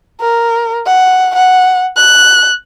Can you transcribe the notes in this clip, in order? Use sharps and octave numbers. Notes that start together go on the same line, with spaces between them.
A#4
F#5
F#5
F#6